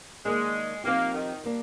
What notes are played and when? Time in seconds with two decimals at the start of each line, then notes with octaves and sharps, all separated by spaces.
0.25 D#3 G#3 A#3 D4
0.84 F3 A#3 C4 D#4 G4
1.14 D#3
1.44 G3 A#3 D4